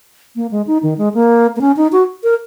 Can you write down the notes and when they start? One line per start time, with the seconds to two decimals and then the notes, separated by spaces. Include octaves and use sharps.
0.36 A#3
0.51 G#3
0.67 D#4
0.83 D#3
0.98 G#3
1.14 A#3
1.56 A#3
1.61 C#4
1.77 D#4
1.92 F#4
2.24 A#4